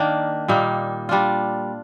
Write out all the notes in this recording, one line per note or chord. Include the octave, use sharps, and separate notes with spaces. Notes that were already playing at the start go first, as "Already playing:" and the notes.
Already playing: D#3 A#3 D4
A#2 G3 A#3 D#4
G3 D4 F4